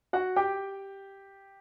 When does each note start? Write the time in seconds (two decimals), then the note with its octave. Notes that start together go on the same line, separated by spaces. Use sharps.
0.13 F#4 F#5
0.36 G4 G5